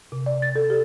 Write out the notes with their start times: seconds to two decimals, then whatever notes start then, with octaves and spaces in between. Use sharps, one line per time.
0.12 C3
0.26 D5
0.42 A6
0.56 A4
0.70 G4